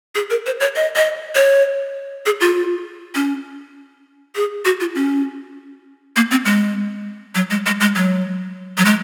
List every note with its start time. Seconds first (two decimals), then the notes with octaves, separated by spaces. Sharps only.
0.15 G#4
0.30 A#4
0.46 C5
0.60 C#5
0.76 D#5
0.96 D#5
1.35 C#5
2.26 G#4
2.41 F4
3.15 C#4
4.36 G#4
4.65 F#4
4.80 F4
4.95 C#4
6.16 A#3
6.31 C4
6.45 G#3
7.35 F#3
7.50 G#3
7.66 G#3
7.80 G#3
7.96 F#3
8.78 F#3
8.85 G#3